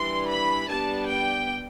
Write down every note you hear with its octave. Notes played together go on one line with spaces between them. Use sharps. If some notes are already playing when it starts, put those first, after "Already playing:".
Already playing: E3 G3 D4 C6
B5
G3 B3 D4 A5
G5